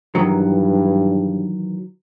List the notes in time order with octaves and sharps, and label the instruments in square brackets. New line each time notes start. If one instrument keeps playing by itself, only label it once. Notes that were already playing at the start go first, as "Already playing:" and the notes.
[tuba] G2 [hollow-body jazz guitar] D#3 E3 F#3